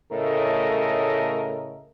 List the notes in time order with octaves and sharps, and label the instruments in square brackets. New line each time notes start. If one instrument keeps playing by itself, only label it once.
[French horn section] A2 C#3 A3 A4 A#4 D#5